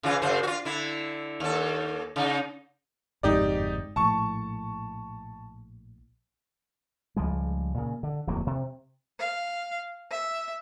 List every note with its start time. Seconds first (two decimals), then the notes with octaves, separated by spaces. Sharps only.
0.03 C#3 E3 F4
0.22 F#2 C#3 C5
0.43 F4 F#4
0.65 D3 E4
1.40 D#2 A4
2.16 C#3 D#4
3.23 G1 F2 G#2 D#4 G4 D5
3.96 A#1 A2 A5 C#6
7.16 C#2 F3 G3 G#3
7.74 A#2 C#3
8.03 D3
8.27 D1 F2 F#3 A#3
8.47 C3
9.20 F5
10.11 E5